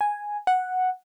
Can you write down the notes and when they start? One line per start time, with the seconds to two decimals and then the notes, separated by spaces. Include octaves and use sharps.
0.01 G#5
0.47 F#5